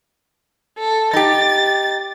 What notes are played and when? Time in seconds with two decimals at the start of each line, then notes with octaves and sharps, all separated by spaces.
0.78 A4
1.13 D#4 G4 A6